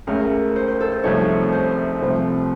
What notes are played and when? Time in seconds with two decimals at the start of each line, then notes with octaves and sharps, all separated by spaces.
0.07 C#2 C#3 A3 A#4
0.56 C5
0.68 C5
0.80 A4
0.92 C5
1.03 C2 C3 F3 A3 D#4 C#5
1.52 C5
2.01 C2 C3 F3 A3 C4